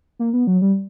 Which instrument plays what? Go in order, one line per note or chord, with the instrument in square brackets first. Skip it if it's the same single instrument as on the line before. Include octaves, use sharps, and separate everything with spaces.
[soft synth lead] A#3
B3
F#3
G3